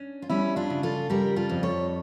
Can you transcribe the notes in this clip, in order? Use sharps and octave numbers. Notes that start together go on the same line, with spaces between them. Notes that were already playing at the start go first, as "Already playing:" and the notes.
Already playing: C#4 D4
F4
G3 C#4 E4
D4 F4
C#3
F4 A4
G3 G4 A#4
F4 A4
F2
A4 C#5